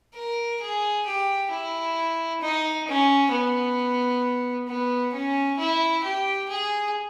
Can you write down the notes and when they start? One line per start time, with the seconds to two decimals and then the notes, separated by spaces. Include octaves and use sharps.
0.15 A#4
0.61 G#4
1.06 G4
1.51 E4
2.41 D#4
2.87 C#4
3.31 B3
4.68 B3
5.13 C#4
5.58 E4
6.03 G4
6.48 G#4